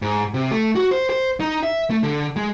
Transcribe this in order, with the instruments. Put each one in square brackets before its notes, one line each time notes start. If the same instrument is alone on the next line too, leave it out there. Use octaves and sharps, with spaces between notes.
[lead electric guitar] G#2
C3
A3
F#4
C5
C5
D#4
E5
A3
D3
G#3